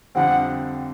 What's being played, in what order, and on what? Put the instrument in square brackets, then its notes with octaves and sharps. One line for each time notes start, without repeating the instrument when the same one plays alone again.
[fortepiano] F2 D3 G3 C4 [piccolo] F#5